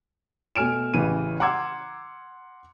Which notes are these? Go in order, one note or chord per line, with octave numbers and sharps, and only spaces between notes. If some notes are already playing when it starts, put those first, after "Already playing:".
B2 A3 G#5 F6 D7 E7
A1 C#3 E3 D#7
F#5 A#5 C6 D6 E6 G#6